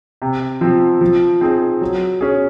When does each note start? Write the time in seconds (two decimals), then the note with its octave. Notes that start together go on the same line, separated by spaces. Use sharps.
0.22 C3
0.61 F3 C4
1.01 F3
1.41 C4 D#4 G#4
1.81 F#3
2.21 C#4 G#4